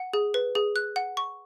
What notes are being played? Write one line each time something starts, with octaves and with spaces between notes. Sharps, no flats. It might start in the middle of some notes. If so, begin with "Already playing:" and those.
Already playing: F#5
G#4
B4
G#4
F#6
F#5
C#6